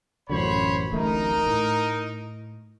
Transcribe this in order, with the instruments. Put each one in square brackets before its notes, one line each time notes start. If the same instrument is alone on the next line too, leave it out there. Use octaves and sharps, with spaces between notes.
[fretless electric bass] A1 F#2 D3 [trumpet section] C5 C#5 B5
[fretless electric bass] D1 A1 A3 [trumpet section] D#4 A#4
[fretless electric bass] A2